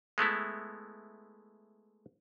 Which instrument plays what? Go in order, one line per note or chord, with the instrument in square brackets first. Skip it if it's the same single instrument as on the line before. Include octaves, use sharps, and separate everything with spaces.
[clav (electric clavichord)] G#3 A3 B3 E4